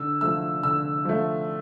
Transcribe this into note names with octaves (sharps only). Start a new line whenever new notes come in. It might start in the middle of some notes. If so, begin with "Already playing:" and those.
Already playing: D3 E6
F3 A3 E6
D3 E6
F3 A3